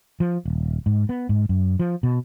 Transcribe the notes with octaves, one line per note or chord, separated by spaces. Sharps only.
F3
D#1
G#2
B3
G#2
F#2
F3
B2